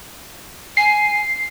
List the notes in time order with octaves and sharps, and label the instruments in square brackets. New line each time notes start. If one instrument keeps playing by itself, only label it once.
[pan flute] G#5 [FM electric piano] C7